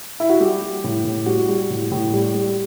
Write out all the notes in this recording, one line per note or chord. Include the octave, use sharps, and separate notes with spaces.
E4
F#4
G3 G4
G3
A2
A2
G3 F#4
G3
A2
A2
G3
G3